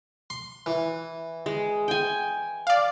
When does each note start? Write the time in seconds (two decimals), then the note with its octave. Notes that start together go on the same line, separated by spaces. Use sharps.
0.30 C6
0.66 E3
1.46 G#3
1.88 G5 G#5
2.67 D5 F5